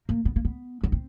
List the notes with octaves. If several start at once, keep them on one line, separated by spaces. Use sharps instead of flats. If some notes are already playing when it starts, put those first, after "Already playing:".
A#3
B3
A#3
B3
B3
C4